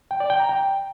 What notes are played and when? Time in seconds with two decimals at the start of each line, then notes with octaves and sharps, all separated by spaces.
0.11 G5
0.20 D5
0.30 G5
0.40 A#5
0.49 G5